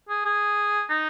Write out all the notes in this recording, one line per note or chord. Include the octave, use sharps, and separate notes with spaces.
G#4
G#4
D#4